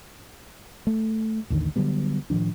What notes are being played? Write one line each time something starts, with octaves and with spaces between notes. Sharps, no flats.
A3
A1 D#2 D3 D#3
D3 F#3 G3 B3
A2 D#3 F3 D4